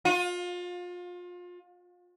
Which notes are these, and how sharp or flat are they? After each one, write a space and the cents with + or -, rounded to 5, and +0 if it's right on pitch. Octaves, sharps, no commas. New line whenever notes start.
F4 +30